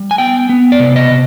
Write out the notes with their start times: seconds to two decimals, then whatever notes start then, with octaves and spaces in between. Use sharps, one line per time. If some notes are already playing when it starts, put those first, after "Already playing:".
Already playing: G3
0.11 G#5
0.18 B3 G5
0.49 B3
0.72 D5
0.80 C3
0.96 D#5
1.11 C3